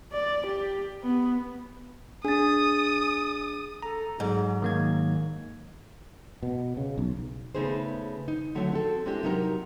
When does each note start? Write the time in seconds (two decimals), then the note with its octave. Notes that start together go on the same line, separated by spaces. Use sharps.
0.13 D5
0.47 G4
1.03 B3
2.25 D4 G#4 D#6 A6
3.83 A4 A#5
4.20 G#2 F#3
4.62 D#3 A#3 G#6
6.43 B2
6.77 C#3
6.98 B1
7.55 C#3 A3 B3 D#4 G#4 C5
8.28 D#4
8.55 D3 F#3 A3 C4 F#4 C#5
8.72 C4 F#4 A4
9.05 G#3 A#3 C4 D4 E4 G4
9.23 C3 F#3 D#4 G4 A#4